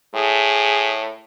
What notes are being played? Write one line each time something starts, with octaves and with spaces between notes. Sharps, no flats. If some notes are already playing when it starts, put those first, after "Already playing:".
A2 G#4